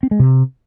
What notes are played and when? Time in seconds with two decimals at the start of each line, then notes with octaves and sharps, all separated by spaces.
0.03 C4
0.11 G#3
0.20 C3